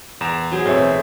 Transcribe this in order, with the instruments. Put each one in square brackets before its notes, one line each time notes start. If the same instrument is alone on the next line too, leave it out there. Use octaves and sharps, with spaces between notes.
[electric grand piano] E2 A#5 E7 [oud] A#2
[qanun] F#3 G#4 C5
[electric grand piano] B1 E5 [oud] A2 E3 C#5 [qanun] C4